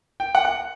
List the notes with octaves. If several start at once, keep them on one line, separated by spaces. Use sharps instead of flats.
G5
F#5
F#5